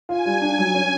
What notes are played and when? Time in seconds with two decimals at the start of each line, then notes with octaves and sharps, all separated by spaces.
0.09 F4 G#5
0.26 G3
0.41 D4
0.59 F#3
0.74 C#4